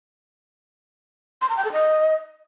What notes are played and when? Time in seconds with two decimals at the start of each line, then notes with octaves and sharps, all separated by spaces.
1.41 C6
1.49 A#5
1.57 G5
1.65 A4
1.72 D#5